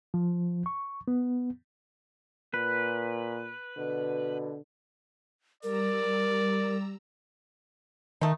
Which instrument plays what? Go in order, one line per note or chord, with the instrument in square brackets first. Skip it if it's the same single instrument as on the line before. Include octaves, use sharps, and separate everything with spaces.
[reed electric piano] F3
C#6
B3
[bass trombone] A#2 [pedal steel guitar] B4
[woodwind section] B2 [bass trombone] D3
[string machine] G3 A#5 E6 [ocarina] A#4 [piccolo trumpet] D5
[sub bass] D#3 [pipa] A3 D#4